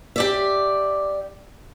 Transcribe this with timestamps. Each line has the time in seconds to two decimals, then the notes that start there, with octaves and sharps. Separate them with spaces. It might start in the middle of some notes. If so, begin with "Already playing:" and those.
0.16 G4 D5 E5